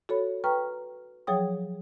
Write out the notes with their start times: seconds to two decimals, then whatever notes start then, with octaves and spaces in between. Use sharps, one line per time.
0.09 F#4 A4 C#5 B5
0.44 B4 G5 A#5 C#6 F6
1.27 F3 F#3 G#4 C#5 G5 D#6